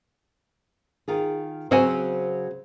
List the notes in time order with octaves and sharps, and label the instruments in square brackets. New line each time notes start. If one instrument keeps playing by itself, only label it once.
[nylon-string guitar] D#3 F4 G#4
[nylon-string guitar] C#3 F#3 C5 [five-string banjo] C4 F#4 G#5